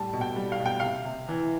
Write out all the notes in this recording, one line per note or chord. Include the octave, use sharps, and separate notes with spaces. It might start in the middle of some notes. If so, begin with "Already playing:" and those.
Already playing: A2 G3 A5
B2
G5
G3
F5
B2
G5
C3 F5
C3
E3